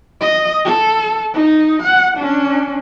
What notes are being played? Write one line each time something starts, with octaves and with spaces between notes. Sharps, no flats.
D#5
A4
D#4
F#5
C#4 D4